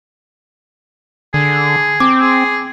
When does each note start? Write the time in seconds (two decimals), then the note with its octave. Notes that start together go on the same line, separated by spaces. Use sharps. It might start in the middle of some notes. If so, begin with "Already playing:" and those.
1.34 D3 G#4
2.00 C4 D6
2.20 G#4